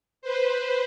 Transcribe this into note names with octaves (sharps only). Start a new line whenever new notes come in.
B4 C5